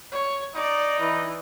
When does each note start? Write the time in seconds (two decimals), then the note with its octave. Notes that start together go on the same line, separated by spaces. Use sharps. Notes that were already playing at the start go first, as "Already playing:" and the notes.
0.12 C#5
0.55 D#4 D5
1.00 E3